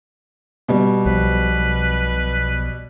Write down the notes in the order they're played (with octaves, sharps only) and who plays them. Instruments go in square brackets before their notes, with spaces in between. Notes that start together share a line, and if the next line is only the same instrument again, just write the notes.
[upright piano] B2 G3
[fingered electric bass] B1 F3 [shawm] B4